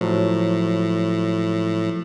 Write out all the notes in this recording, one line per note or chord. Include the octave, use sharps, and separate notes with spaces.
A2 F3 F#3